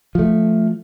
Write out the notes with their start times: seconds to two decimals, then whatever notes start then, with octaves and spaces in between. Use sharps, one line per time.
0.15 F3 A3